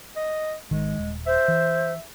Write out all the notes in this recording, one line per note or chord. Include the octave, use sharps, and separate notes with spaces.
D#5
G#1 D#3 G#3
D#1
C5 E5
E3